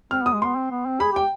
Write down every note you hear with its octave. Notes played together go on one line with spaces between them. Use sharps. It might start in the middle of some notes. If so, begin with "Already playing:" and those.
C4 F6
B3 D#6
G#3
B3 C6
C4
B3
C4
G#4 B5
G4 G5